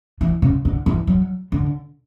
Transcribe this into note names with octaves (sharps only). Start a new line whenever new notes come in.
E3
C#3
D3
E3
F#3
D3